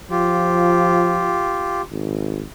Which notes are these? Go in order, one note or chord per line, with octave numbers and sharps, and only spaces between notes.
F3 F4 G4
G#1